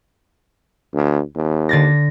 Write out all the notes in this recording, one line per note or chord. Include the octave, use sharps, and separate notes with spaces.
D2
D#2
D3 A6 A#6